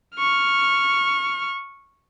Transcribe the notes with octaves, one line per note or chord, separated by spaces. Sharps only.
C#6 F6